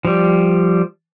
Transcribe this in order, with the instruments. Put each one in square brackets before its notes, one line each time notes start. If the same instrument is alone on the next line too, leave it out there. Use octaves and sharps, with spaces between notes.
[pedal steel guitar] F3 G3